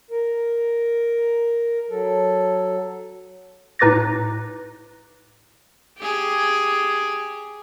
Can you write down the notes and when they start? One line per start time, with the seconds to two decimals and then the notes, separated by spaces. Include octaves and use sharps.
0.11 A#4
1.90 F#3 A4
3.79 A2 D#4 B4 D6 A6 A#6
5.98 G4 G#4